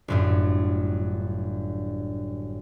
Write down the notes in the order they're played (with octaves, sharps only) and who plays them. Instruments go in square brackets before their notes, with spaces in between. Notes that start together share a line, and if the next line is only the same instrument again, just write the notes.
[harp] G1 F#2 A2